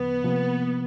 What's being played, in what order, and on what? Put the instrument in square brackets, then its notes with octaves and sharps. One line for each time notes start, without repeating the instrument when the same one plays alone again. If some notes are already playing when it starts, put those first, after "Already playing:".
Already playing: [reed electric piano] D2 C#3 F3 [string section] B3
[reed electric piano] C3 F3 A#3